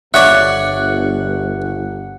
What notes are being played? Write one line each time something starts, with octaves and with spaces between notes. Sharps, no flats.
G1 D4 C#5 E5 F#5